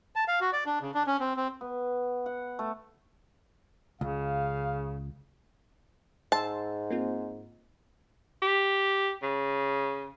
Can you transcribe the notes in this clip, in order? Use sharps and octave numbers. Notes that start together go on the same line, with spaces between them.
A5
F5
F#4
D5
D4
C#3
D4
C#4
C4
C4
B3
F#5
A3
C#2 C#3 F5
G#2 A5 C6 E6
A#3 C4 F4
G4
C#3